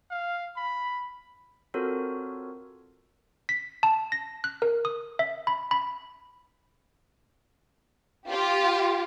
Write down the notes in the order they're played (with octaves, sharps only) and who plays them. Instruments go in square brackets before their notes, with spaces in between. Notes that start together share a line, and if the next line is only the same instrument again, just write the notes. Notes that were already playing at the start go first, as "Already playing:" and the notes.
[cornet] F5
B5
[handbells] C4 F4 F#4 A4 A#4 C#5
B6
A5
A#6
F#6
A#4
D#6
E5
B5
B5
[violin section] F4 G4